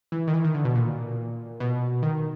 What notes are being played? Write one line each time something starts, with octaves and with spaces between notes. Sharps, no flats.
E3
D#3
E3
D#3
D3
B2
A#2
B2
D#3